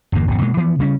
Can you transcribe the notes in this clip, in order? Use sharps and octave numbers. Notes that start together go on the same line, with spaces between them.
G1 E2 G2 A#3
G1 E2 C#3
B2 G#3 A#3
E3 F3 B3
C#3 G3 B3 C#4